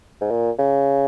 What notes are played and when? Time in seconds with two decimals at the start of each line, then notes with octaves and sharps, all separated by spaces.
0.21 G#2
0.31 A#2
0.59 C#3